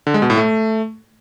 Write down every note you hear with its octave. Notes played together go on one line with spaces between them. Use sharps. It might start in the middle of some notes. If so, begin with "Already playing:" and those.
D3
G#3
B2
A2
A3